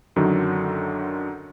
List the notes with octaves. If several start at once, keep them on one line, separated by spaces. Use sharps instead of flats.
F#2 D3 D#3 F#3